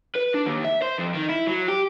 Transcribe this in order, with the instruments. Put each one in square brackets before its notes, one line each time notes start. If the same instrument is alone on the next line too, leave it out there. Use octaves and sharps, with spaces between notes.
[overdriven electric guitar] B4
D4
D#2
E5
C5
F2
D#3
E4
F#3
G4